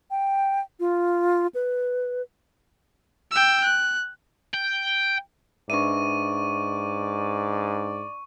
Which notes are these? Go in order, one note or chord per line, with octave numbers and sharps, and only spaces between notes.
G5
F4
B4
G5 E6
F#6
G5
G#2 D4 B4 D5 E5 C#6 D#7